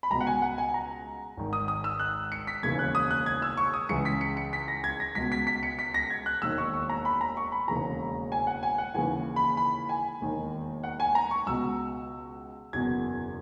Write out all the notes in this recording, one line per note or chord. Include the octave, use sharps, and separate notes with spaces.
B5
C#2 B2 A#5
F#5
G#5
F#5
G#5
A#5
G#1 G#2 D#3
D#6
D#6
E6
F#6
C#7
B6
E1 D#2 C#3 E3 G#6
F#6
D#6
F#6
G#6
E6
C#6
D#6
C#2 C#3 E3 C#7
B6
C#7
C#7
B6
A#6
G#6
A#6
C#2 B2 B6
B6
B6
C#7
B6
A#6
G#6
F#6
E1 D#2 D#3 E6
C#6
C#6
A#5
B5
A#5
C#6
B5
E1 D#2 C#3 E3 A#5
G#5
F#5
G#5
F#5
D#2 C#3 E3 G#5
B5
B5
G#5
E1 D#2 D#3
F#5
G#5
A#5
C#6
C#2 B2 E6
F#1 E2 B2 G#6